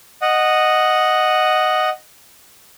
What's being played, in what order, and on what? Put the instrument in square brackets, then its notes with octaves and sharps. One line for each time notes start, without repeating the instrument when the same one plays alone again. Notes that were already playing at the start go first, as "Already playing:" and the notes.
[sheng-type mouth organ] D#5 F#5